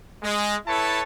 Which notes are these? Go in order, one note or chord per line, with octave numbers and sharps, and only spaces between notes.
G#3
E4 A4 B4 C#5 A5